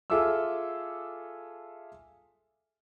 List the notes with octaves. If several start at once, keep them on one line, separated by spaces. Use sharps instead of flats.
F4 G#4 A4 E5 D6 E6